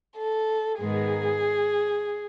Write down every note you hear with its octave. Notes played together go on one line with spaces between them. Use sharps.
A4
G#2 D#3 G#3 B3 G#4